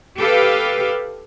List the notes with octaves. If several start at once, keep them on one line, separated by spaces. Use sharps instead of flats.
G4 A4 B4 F5